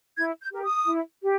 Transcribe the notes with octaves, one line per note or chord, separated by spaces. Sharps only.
E4 G#6
G6
G4 A#4
D#6
E4
G4